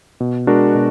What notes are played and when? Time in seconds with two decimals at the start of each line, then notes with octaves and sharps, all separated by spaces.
0.20 B2
0.47 G#3 D4 F#4 A#4
0.75 B2